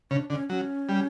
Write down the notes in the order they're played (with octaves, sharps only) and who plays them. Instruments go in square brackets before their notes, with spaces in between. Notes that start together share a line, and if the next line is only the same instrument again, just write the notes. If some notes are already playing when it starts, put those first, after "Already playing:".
[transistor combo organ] C#3 [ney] D4
[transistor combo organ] D3 [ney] C#4
[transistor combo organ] F#3 [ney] C#4
[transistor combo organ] G3